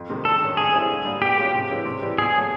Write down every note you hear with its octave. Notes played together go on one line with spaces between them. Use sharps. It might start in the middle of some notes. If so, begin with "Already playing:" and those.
Already playing: F2
C3 D#3 G#3
G2 A4
D#3 G#3 C#4
G2 G#4
D3 G3 C4 E4
D3
G3 A#3
B2 G4
G#3 C#4 F4
C3
E3 G#3 C#4
C3
E3 G3
B2 G#4
F#3 A3